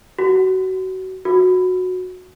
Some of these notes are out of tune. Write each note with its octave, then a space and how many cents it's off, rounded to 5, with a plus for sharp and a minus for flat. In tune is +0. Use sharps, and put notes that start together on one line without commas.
F#4 +25
F#4 -10